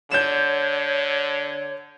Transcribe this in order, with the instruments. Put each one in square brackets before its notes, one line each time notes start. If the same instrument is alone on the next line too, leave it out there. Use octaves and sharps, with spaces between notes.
[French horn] D3 [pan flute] C#5 [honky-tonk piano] G6 E7